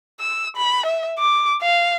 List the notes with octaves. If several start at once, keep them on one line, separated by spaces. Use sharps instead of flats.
E6
B5
E5
D6
F5